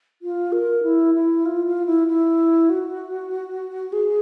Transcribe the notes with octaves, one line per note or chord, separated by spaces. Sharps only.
F4
A#4
E4
E4
F4
F4
E4
E4
F#4
G#4